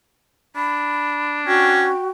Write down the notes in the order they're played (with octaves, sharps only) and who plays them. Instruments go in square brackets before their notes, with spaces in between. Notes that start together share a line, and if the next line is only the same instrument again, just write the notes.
[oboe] D4 [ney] B5
[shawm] C#4 [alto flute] F#4 [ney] G5